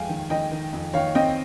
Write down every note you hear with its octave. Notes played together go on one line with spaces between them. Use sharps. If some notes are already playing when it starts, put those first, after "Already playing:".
Already playing: F2 G#3 F5 G5 G#5
D#3
D#3 D#5 G5
D#3
F2
D#3 C#5 F5
C4 D#5 G5